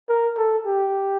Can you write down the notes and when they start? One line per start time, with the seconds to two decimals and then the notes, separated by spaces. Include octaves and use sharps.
0.09 A#4
0.37 A4
0.66 G4